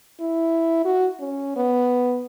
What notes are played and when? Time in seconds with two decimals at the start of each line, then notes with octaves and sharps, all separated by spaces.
0.20 E4
0.85 F#4
1.20 C#4
1.56 B3